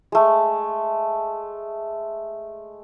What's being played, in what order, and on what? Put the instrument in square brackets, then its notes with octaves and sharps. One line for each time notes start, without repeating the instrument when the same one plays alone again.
[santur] G#3 A3